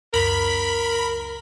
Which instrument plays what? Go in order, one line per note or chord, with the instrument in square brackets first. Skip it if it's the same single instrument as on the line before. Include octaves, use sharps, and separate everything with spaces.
[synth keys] C#2 F#2 [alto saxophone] A#4 [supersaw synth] B5